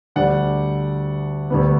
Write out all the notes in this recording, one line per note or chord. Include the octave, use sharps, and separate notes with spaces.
D2 D3 G3 D5 F#5
D2 D3 G3 B3